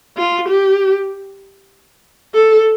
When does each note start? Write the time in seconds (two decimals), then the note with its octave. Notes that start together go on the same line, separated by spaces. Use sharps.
0.17 F4
0.48 G4
2.34 A4